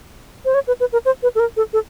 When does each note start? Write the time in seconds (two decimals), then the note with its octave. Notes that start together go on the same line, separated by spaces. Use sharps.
0.45 C5
0.54 C#5
0.67 B4
0.80 B4
0.93 A#4
1.05 C5
1.23 B4
1.35 A4
1.40 A#4
1.57 A4
1.73 A4